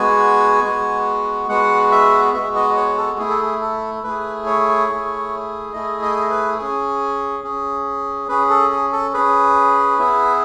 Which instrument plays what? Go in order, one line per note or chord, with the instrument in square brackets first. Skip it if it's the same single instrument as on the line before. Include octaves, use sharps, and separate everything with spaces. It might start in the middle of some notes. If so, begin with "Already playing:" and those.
Already playing: [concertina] G#3 B3 F#4 G#5
G#3 B3 F#4
G#3 B3 F#4 F#5
E5
G#3 B3 F#4 E5
D#5
C#5
A4
A3 E4 G#4
A4
G#4
A4
A3 E4 G#4 B4
C#5
A3 E4 G#4
A3 E4 G#4 D#5
D#5
B4
C#4 G#4
C#4 G#4
C#4 G#4 B4
A4
G#4
A4
C#4 G#4 B4
B3 E4 G#4